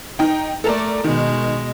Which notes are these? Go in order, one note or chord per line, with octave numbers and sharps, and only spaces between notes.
D#4 G5
A3 A4 A#4 D5
B2 D#3 G#3